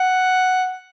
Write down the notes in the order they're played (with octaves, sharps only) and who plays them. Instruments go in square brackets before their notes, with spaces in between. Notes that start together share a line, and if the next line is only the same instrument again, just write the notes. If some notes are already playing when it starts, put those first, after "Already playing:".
Already playing: [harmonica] F#5